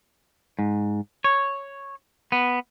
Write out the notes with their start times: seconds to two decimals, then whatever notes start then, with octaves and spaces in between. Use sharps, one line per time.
0.59 G#2
1.24 C#5
2.32 B3